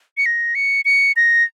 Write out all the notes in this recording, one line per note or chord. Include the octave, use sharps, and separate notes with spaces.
C#7
A#6
C#7
C#7
A#6